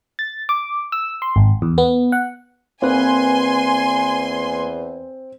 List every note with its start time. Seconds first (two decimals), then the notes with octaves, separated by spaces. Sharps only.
0.19 A6
0.49 D6
0.92 E6
1.22 C6
1.36 G#1
1.62 E2
1.78 B3
2.12 F#5
2.82 E2 A#3 C4 B4 G#5 C6